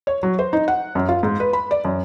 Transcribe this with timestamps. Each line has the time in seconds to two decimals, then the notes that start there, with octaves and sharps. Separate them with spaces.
0.07 C#5
0.23 F#3
0.39 C5
0.53 D#4
0.68 F#5
0.95 F#2
1.09 F4
1.23 G#2
1.40 B4
1.53 B5
1.71 D5
1.85 F#2